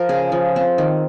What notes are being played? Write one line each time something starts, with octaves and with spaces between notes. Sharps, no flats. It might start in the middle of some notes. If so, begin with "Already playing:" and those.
Already playing: F3 A#4
C#3 G#4
F3
C4
D#3